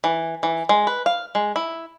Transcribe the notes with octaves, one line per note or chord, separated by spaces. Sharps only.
E3
E3
G#3
B4
F5
G#3
E4